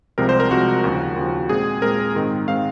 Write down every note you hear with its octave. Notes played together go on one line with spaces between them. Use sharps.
C2 C3 F3 G#3 C4 A#4
C5
A#4
C2 C3 F3 G#3 C4 F#4
D#2 C#3 F3
D#2 C#3 F3
A#2 G#3 C4 G#4
A#2 G#3 C4 A#4
G#2 D#3 G#3 C4
D#3 G#3 C4 F5